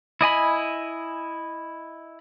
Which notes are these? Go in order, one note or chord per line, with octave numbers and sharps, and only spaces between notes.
E4 D#5 G#5 B5